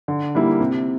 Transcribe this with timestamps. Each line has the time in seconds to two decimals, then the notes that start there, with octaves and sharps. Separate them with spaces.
0.08 D3
0.35 G3 A#3 E4 A#4
0.60 C3